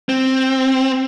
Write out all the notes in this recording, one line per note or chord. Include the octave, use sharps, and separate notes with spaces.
C4